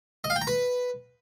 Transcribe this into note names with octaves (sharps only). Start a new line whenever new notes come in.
D#5
F5
G5
A#5
B4